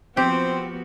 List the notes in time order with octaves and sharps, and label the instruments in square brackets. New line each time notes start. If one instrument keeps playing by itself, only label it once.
[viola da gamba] F3 B3 F#4 [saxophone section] C4 [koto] G4